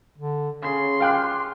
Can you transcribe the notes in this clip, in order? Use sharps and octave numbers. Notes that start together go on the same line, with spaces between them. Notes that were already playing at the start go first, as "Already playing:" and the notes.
D3
C#3 C#4 G#4 C6
F4 G4 F5 G5 F#6